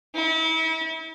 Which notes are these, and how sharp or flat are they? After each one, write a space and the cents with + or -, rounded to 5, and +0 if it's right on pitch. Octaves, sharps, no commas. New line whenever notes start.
E4 -35